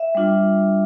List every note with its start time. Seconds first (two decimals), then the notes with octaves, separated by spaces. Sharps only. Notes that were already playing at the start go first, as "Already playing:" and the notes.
Already playing: E5
0.15 G3 D4 F4